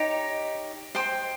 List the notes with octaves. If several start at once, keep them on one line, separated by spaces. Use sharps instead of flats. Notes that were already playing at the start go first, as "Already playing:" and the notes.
Already playing: D#4 G4 C#5
C5 G5 C6